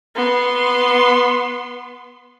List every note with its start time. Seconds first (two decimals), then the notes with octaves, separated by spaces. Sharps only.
0.16 B3 C6